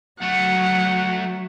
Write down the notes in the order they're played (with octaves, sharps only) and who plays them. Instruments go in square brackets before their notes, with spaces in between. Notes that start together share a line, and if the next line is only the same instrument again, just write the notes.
[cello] F#3 [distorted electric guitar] A3 F#4 [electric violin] F#5